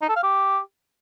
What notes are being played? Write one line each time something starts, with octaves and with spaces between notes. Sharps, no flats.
D#4
A4
F5
G4